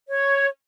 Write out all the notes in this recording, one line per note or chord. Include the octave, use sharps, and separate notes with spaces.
C#5